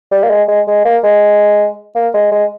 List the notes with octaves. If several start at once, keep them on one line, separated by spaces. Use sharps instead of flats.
G3
A#3
G#3
G#3
G#3
A#3
G#3
A#3
G#3
G#3